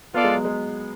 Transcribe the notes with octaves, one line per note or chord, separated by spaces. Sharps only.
B3 F4 A4 D5 F5
G#3
F#3
G#3